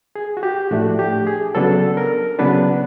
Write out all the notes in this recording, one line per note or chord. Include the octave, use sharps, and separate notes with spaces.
G#4
F#4
G4
A2 F3 A3 D4 F#4
G4
G#4
C#3 F#3 B3 D4 A4
A#4
C#3 F#3 B3 D4 B4